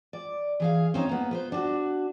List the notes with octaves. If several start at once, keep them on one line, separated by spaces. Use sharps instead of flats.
D5
E3 G#4 F5
C4 C#4 D#4
A#3 B3
B3 B4 C5
D4 F#4